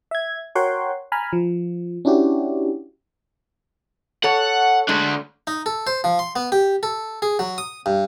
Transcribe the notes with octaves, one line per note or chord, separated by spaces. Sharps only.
E5 G#6
F#4 A#4 C#5 F#5 G5 C6
G#5 A#5 B5 F6
F3
C#4 D4 E4 F#4 G4
A4 C#5 F#5
G#3 A3 D4
D#4
A4
C5
F3
C6
B3
G4
A4
G#4
F#3
D#6
G2